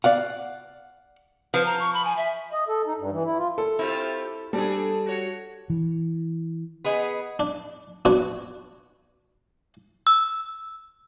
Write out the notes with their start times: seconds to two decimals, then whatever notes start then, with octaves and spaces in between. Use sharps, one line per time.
0.04 D5 F5 F#5
1.54 F3 B4
1.65 A#5
1.80 C#6
1.94 B5
2.05 G#5
2.17 E5
2.53 D#5
2.68 A4
2.86 D#4
2.98 G2
3.12 E3
3.25 E4
3.38 F4
3.58 A4
3.79 C4 E4 F4 G4
4.53 G3 C4 D4 G#4 A4
5.06 F#4 C#5
5.70 E3
6.84 B3 G#4 D#5
7.39 D4
8.05 B3 D4 F#4 C#5
10.07 E6